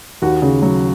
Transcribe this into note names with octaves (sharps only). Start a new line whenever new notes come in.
D#2 F#4
C#3
F#3